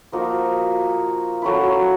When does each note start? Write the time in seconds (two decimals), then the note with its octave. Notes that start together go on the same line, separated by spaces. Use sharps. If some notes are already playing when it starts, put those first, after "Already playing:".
0.12 F3 A#3 D#4 F#4
1.42 F#3 A3 C#4 E4